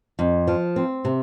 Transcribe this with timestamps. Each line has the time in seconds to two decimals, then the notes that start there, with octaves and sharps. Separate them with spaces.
0.19 F2
0.48 F3
0.76 C4
1.05 C3